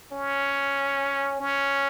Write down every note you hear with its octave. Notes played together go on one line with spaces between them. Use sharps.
C#4
C#4